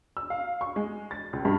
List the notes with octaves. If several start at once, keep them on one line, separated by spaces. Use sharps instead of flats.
E6
F5
C#6
G#3
A6
C#2
G2